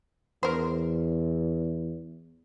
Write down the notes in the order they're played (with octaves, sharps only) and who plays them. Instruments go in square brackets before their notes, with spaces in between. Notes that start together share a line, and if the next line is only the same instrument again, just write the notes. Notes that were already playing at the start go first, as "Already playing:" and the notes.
[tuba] E2 [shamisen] A#4 C5